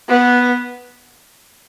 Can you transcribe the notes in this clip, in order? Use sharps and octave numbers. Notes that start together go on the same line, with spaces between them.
B3